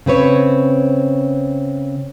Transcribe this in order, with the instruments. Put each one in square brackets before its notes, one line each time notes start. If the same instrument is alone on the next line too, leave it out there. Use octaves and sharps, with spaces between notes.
[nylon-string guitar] C#3 C4 B4 C#5